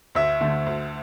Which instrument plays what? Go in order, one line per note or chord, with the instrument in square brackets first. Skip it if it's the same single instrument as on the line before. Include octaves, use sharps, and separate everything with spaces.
[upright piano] D2 [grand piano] E5
[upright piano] D3 A3
D2